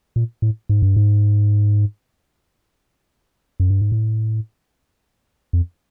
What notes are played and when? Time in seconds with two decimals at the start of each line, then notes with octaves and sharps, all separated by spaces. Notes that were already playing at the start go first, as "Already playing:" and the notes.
0.16 A#2
0.42 A2
0.69 G#2
0.82 G2
0.97 G#2
3.60 F#2
3.70 G2
3.82 G#2
3.92 A2
5.53 F2